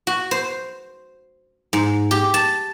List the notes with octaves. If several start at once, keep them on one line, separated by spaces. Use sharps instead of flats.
F#4
C5
G#2
G4
A5